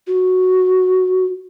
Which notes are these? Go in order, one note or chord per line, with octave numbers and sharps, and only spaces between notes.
F#4